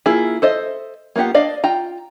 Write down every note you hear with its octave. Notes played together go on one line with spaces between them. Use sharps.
A#3 E4 F4 G#4
A4 C5 D#5 E5
A#3 B3 F4 G4 F#5
D4 D5 D#5 F5
F4 G5 A#5